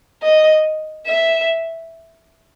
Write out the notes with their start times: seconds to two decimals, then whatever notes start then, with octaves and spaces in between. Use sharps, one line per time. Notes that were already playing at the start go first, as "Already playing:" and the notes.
0.22 D#5
1.07 E5